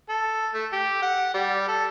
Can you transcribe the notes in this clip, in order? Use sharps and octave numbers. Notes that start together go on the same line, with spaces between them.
A4
A3
G4
F#5
G3
A4